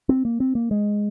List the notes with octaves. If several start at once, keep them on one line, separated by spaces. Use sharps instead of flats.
C4
A#3
C4
A#3
G#3